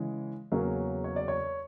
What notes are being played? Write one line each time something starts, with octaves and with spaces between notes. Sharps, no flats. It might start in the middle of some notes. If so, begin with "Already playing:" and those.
Already playing: C#3 E3 G#3
E2 C#3 F#3 A#3 C#4
C#5
D5
C#5